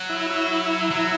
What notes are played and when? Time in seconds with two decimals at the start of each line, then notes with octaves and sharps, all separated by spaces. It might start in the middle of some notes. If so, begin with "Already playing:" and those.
Already playing: F#3
0.09 E4
0.31 E4
0.91 F#3